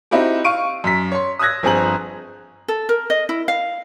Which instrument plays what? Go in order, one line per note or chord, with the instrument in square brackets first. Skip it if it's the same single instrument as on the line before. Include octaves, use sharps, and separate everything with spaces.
[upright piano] C4 D#4 E4 F#4 G4
F5 C#6 D7 D#7
F#2 B6
C#5 C6
D#6 E6 F#6 G#6 A#6
G1 F3 C4 G#4 A#5 F#7
[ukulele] A4
A#4
D#5
E4
F5